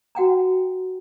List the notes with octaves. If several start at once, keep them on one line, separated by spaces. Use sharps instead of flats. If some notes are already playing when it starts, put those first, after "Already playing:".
F#4 F#5 G5 A#5